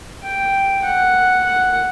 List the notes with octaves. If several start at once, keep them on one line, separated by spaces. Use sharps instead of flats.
G5
F#5
F#5